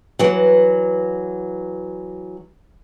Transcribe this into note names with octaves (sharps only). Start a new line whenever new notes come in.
E3 F#3